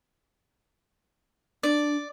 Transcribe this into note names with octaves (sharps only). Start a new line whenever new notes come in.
D4 D5